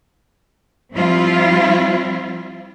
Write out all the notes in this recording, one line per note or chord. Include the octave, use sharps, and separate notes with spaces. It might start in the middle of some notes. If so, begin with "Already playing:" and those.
F3 G3 C4 E4 F4